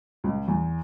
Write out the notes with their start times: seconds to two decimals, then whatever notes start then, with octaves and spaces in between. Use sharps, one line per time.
0.24 C#2
0.48 E2